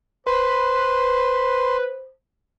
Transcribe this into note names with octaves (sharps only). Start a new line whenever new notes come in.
B4 C5 C6